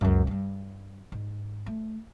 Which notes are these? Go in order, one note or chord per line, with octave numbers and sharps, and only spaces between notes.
C#2 F#2
G2 G3
G#2
A3